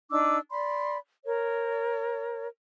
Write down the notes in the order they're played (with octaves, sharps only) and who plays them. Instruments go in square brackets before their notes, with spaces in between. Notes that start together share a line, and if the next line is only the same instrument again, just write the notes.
[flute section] D4 D#4 D6 E6
D5 B5 C6
A#4 C#5